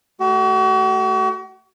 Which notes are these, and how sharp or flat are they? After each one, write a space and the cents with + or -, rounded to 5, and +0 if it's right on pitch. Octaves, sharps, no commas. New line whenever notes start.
A3 +0 F#4 +40